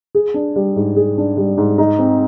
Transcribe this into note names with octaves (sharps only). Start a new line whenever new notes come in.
G#4
D4
G3
G#2
G#4
D4
G3
G#2
D#4
C4